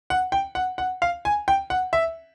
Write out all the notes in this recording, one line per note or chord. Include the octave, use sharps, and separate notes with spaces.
F#5
G5
F#5
F#5
F5
G#5
G5
F#5
E5